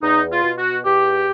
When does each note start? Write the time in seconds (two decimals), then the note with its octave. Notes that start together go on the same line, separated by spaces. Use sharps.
0.02 E2 D#4
0.30 F4
0.44 B2
0.57 F#4
0.85 E2 G4